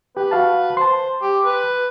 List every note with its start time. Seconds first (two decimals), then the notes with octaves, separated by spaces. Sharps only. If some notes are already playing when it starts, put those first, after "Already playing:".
0.17 G4 B4
0.31 F#4 F5 A5
0.77 C5 A5 C6
1.22 G4
1.45 B4